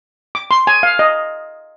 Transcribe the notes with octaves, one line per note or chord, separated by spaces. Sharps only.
D6
C6
G#5
F5
D#5